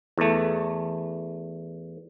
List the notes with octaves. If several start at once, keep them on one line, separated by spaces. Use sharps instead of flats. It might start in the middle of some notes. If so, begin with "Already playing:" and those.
E2 A3